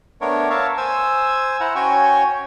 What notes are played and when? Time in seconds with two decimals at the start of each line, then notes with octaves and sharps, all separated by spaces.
0.21 A3 B3 D4 A#4 C#5
0.50 A#4 C#5 E5 F5 A5
0.77 C5 G#5 E6
1.60 E4 C5 F#5 A#5
1.75 C#4 F#4 C#5 G5 G#5